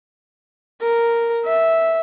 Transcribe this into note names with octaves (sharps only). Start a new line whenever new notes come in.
A#4
E5